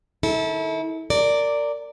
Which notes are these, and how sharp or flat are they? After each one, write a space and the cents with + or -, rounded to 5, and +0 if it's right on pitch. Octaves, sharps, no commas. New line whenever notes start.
D#3 -25 E4 -35 A4 -10
A#4 -20 D5 -5